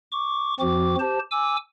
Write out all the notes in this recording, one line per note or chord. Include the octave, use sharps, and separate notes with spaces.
C#6 D6
F2 F3 C4 F#4 D6
G4 C5 A5
G#5 D6 E6